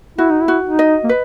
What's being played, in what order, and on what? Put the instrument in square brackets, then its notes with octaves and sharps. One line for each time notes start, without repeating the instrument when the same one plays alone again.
[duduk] E4 [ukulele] F#4
[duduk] D#4
E4
[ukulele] F#4
[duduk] D#4
[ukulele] D#5
[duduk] A#3
[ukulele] B4